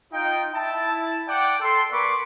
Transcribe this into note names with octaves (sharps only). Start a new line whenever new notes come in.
D#4 F4 G5
E4 A5
D5 F#5 G5 D6
A4 C6
A#3 B4 D5 B5 C#6 D6